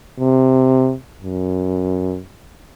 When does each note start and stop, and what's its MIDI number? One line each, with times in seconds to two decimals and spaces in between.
0.19 0.93 48
1.22 2.20 42